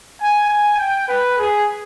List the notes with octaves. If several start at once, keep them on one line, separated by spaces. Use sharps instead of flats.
G#5
G#5
G5
B4
G#4